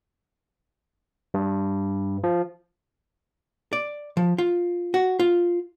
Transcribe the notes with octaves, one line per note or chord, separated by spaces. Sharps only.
G2
F3
D5
F3
F4
F#4
F4